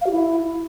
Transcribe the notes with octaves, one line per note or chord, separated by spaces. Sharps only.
F5
F#4
E4